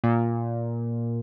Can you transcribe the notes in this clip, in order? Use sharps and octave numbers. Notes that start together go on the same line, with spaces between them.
A#2